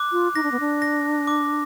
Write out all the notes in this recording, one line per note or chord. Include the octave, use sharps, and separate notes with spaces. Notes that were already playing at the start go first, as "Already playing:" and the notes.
Already playing: D6 F#6
F4
D#4 A#6
D4
B3
D4
A#6
D6